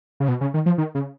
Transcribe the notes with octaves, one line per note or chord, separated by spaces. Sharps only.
C#3
B2
C#3
D#3
F3
D#3
C#3